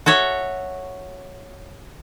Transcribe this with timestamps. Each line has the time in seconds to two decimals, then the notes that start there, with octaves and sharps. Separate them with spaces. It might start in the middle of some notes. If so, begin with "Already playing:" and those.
0.06 F#4 A4 C#5 E5